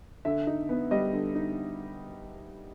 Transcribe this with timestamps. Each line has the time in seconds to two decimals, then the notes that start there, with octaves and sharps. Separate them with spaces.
0.25 D3 E5
0.47 D#4
0.69 B3
0.91 G3 D#5
1.13 D3
1.35 D#4